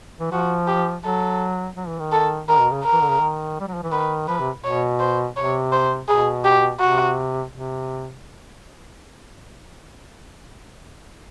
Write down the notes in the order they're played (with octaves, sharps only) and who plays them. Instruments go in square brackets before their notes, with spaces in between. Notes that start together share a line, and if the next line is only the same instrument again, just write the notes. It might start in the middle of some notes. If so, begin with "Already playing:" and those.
[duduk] E3
[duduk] F3 [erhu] F#4
[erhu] G4
[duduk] F#3 [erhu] A4
[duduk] F#3
E3
D#3
[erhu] A4
[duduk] D#3 [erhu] A#4
[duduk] B2
C#3
[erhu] A#4
[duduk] E3
D3
C#3
D#3
G3
F#3
F3
E3
[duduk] D#3 [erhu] B4
[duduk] F3 [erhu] B4
[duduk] C3
[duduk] B2 [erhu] C#5
[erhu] C5
[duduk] C3 [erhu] C#5
[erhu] C5
[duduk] B2 [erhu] G#4
[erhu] G4
[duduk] C3 [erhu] F#4
[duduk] C3